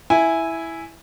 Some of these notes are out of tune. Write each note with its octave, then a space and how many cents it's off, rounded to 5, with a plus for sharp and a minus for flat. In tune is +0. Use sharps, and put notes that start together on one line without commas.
E4 +0 G#5 +0